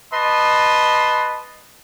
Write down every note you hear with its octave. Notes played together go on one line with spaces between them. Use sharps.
B4 D#5 A5 C6